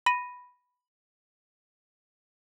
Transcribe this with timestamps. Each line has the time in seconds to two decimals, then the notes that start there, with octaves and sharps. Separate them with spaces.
0.06 B5 A#6 D#7